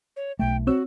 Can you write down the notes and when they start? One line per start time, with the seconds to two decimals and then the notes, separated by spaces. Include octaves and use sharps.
0.17 C#5
0.39 B1 A3 G5
0.67 C4 F#4 C#5 E6